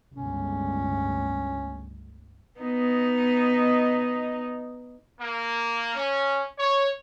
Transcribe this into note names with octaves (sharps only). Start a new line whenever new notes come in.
G1 C#2 A2 C#4
B3 D#4 D#5
A#3
C#4
C#5